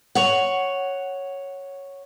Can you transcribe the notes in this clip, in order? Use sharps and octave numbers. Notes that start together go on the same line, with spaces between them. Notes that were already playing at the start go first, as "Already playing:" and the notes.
C#5 F#5